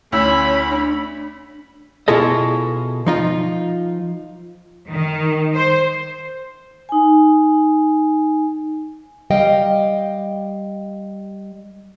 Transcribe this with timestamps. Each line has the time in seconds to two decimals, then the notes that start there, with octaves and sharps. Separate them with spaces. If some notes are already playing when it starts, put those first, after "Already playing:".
0.12 D2 C#4 E4 C#5 B5 E6
0.69 D4
2.08 B2 E4 F4 G#4 A4 D#5
3.06 F3 D#4 F4
4.91 D#3
5.54 C5
6.89 D#4 G#5
9.31 G3 D#5 F5 G5